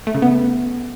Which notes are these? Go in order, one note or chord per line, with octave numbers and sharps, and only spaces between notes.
A3
C#3
B3